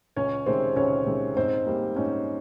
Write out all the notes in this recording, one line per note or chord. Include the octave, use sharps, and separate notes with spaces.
C#2 C#4 C#5
C3 D#3 G#3 C4 C5
C#2 C#4 C#5
C3 D#3 G#3
G#2 C4 C5
G3 A#3
G#2 C#4